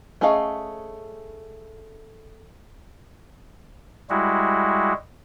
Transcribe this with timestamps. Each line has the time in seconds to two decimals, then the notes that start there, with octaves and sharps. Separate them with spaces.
0.21 A3 C#4 G#4 D#5 F5
4.10 G3 G#3 E4 F#4